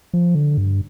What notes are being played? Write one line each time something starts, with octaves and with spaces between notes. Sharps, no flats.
F3
D3
G2